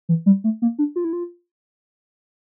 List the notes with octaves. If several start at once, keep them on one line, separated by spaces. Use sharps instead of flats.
E3
G3
A3
A#3
D4
F4
E4
F4